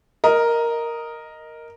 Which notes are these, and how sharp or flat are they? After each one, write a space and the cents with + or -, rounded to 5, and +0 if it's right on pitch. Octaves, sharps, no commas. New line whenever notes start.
A#4 +0 D#5 +0